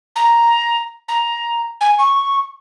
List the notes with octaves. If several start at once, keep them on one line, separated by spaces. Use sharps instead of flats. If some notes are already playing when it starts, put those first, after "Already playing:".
A#5
A#5
G#5
C#6